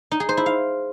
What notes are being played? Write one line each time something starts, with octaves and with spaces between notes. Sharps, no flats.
D#4
G#4
C5
E4
F5